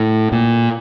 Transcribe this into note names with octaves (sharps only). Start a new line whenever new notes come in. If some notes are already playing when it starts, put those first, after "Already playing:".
Already playing: A2
A#2